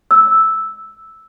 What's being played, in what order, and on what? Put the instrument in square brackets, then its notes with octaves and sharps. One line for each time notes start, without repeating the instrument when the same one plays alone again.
[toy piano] E6